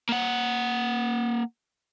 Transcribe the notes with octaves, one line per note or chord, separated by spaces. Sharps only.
A#3 F#5